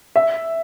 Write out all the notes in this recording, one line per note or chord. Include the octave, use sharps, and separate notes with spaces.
E5